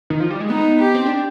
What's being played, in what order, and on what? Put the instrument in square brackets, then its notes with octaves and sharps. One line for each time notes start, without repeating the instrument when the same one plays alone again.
[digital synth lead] D#3
F3
G3
G#3
[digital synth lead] B3 [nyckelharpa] D#4
[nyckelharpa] G4
[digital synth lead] C4
D4